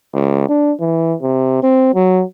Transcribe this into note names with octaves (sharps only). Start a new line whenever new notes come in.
C#2
D4
E3
C3
C4
F#3